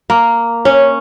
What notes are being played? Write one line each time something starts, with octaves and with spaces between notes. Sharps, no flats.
A#3
C#4